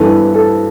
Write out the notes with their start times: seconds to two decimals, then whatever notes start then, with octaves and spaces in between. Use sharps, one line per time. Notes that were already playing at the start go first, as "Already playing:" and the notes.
Already playing: G2 E3 B3 A4
0.35 A4